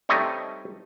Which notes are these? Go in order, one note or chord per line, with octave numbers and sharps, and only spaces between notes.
G3 A3 C4 D#4 C#5 D#5